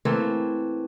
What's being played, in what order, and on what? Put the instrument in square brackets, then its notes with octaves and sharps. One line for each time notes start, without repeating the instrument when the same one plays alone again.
[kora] E3 A3 A#3 C4